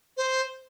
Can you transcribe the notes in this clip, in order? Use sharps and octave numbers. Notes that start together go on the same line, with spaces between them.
C5